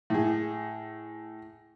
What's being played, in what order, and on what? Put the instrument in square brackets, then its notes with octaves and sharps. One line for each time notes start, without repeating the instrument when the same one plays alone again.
[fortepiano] A2 G#4